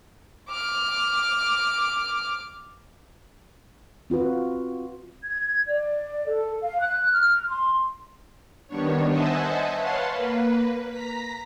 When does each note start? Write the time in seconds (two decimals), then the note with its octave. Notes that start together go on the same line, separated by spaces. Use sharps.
0.49 D6 F6
4.10 C4 F4 F#4 B4
5.24 G#6
5.68 D5
6.27 A4
6.61 F5
6.81 F#6
7.11 F6
7.48 C6
8.68 D#3 G3 B3 D4 C#5
9.08 C5 D#5 E5 F#5 G#5 A5
9.73 B4 C#5 F5 F#5 A5 C6
10.11 A#3 B4
10.89 A#5 B6